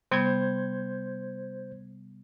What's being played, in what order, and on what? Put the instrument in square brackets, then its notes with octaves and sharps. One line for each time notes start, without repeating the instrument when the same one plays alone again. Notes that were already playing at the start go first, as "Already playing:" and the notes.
[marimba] C3 G3 B3 [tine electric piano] C5 G6 G#6